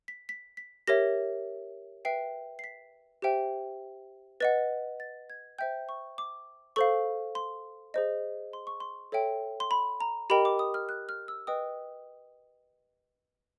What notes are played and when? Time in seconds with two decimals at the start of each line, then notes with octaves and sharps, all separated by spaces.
0.08 B6
0.29 B6
0.57 B6
0.87 G4 A#4 C#5 E5 A#6
2.05 B4 E5 G5 C7
2.59 C7
2.64 B6
3.22 G4 C5 E5 G5
4.40 B4 D#5 F#5 A6
5.00 A6
5.30 G#6
5.58 C5 E5 G5 G6
5.89 C#6
6.18 D6
6.76 A4 C5 F5 C#6
7.35 C6
7.94 G#4 C5 D#5
8.53 C6
8.67 C#6
8.80 C6
9.12 A4 C#5 E5 G5
9.60 C6
9.71 B5
10.00 A#5
10.30 G4 A#4 D#5 G5 B5
10.45 D6
10.59 D#6
10.74 F6
10.89 F#6
11.09 F6
11.28 E6
11.47 B4 D#5 G5 D#6